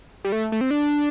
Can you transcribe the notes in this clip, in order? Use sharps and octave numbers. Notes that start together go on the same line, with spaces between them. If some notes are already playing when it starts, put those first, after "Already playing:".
G3
A3
A3
C4
D4